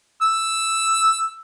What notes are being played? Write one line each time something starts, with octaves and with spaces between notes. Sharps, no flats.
E6